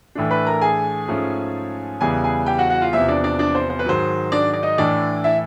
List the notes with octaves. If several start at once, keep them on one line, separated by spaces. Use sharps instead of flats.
A2 E3 A3 D4
B4 B5
A#4 A#5
G#4 G#5
G#2 F3 A3 C#4
E2 C#3 E3 G3 B3 G#4 G#5
G#4 G#5
G4 G5
F#4 F#5
F#4 F#5
F4 F5
E2 C3 F3 E4 E5
D4 D5
D4 D5
D4 D5
C5
C5
B4
G#2 D#3 F#3 C5
D4 D5
D5
D#4 D#5
A2 E3 A3 D4 D5
E4 E5